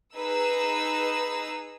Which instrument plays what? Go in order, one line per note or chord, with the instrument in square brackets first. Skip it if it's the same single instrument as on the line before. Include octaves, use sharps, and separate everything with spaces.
[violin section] D#4 G#4 B4 E6